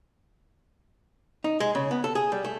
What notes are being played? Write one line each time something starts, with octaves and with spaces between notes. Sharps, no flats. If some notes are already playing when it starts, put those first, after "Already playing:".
D#4
G#3
C#3
B3
A4
G#4
G3
A3